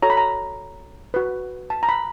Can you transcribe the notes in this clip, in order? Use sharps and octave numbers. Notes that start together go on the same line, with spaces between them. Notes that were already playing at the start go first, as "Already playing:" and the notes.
F#4 A4 C#5 A#5
B5
A#5
F#4 B4
A5
A#5
B5